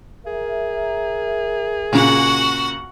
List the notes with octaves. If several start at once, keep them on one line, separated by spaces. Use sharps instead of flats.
G#4 A#4 E5
A#2 C#3 F#4 F#5